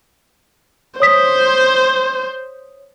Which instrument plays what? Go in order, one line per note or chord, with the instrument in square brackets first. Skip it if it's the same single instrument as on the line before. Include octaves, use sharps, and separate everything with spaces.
[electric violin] C5 [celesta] C#5 D#6 B6